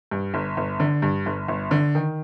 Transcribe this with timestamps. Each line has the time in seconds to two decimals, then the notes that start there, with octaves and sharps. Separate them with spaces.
0.11 G2
0.34 G1
0.57 G1
0.80 D3
1.02 G2
1.26 G1
1.48 G1
1.71 D3
1.95 D#3